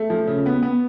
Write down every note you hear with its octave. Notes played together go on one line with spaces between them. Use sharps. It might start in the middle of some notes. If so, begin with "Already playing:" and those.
Already playing: A3
F3
C#3
B3
B3